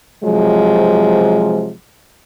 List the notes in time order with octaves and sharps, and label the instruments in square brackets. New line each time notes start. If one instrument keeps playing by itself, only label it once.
[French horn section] C3 F3 F#3 G#3